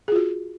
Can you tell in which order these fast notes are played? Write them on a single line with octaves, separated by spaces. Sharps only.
G#4 F4 F#4